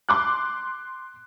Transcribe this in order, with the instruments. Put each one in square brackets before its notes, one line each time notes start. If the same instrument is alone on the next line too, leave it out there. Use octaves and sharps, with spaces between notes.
[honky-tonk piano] C6 D6 F#6